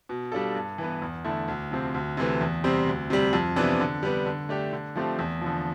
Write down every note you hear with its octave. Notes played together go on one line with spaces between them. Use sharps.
B2
G3 D4 F4 A4
G2
E3 B3
E2
D3 A3 E4
D2
C3 F3 C4
D2
C3 E3 A3
E2
C3 G3 C4
D2
C3 G3
F2
C3 E3 B3 D4
D3
G3 B3 D4
D3
A3 D4 G4
D3
F3 A3 C4 G4
E2
D3 F3